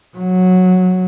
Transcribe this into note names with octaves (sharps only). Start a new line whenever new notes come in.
F#3